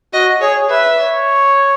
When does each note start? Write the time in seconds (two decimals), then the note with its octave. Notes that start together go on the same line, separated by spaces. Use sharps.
0.13 F#4 D#5
0.41 G#4 C#5
0.69 B4 E5
0.98 C#5